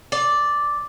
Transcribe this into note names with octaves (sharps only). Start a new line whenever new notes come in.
D5